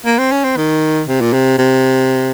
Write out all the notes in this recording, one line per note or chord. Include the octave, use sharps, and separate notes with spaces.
A#3
C4
C#4
C4
D#3
C3
A#2
C3
C3